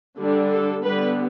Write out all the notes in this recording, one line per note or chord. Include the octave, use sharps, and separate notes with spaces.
D3 G3 D4
A4
D3 G3 B3 B4